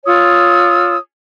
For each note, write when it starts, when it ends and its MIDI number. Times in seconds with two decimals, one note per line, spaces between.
0.05 0.96 65
0.05 0.96 73
0.05 0.96 87
0.05 0.96 88